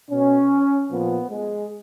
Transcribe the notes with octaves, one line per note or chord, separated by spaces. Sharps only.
B2 C#4
A#2 F3 B3
G#3